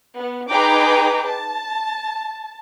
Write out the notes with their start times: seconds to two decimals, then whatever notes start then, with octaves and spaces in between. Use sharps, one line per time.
0.17 B3
0.52 D#4 G#4 B4 G5 A#5 D6
1.25 A5